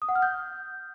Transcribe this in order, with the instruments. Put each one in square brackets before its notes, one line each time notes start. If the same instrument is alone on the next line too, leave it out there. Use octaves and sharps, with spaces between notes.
[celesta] D#6
F#5
F6
G6